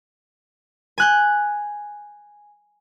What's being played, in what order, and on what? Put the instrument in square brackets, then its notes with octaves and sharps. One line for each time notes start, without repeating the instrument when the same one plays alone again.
[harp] G#5 F#6 G6